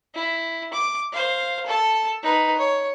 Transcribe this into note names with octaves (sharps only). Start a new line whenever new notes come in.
E4
D6
C5 F5
A4 A5
D#4 B4
C#5